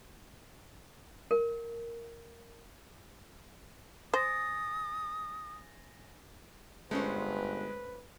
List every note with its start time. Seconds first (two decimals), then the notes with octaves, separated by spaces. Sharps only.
1.31 A#4
4.14 C5 G#5 D#6 A6 A#6
6.91 G1 G#3 A3 C#4 B4 C5